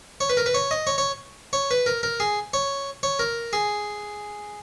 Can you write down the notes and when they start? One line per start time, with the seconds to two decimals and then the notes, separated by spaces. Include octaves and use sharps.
0.21 C#5
0.30 B4
0.37 A#4
0.46 B4
0.54 C#5
0.71 D#5
0.87 C#5
0.98 C#5
1.53 C#5
1.71 B4
1.86 A#4
2.03 A#4
2.20 G#4
2.53 C#5
3.03 C#5
3.19 A#4
3.53 G#4